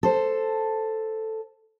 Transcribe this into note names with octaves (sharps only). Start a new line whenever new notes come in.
A4 C5